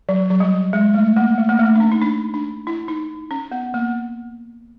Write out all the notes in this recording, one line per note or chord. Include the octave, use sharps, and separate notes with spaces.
F#3
F#3
G3
G#3
A3
A#3
A3
A#3
A3
D4
C#4
D#4
D4
D4
E4
D#4
C#4
B3
A#3